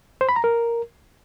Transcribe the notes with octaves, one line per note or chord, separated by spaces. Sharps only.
C5
B5
A#5
A#4